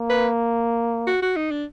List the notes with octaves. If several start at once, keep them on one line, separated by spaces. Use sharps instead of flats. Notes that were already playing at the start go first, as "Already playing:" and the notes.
Already playing: A#3
B4
F#4
F#4
D#4
D4